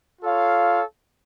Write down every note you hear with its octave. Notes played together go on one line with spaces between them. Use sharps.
F4 A4 C#5 F5